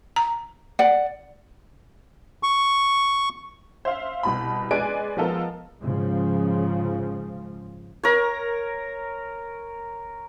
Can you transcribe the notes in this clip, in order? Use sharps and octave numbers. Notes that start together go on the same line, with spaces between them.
A#5
D5 F#5
C#6
C5 E5 F5
C2 B2 B5
G#3 B4 D5 G#5 F#6 D7
F3 G#3 B3 F4 A4 A#4
G#2 C#3 F3
A#4 C#5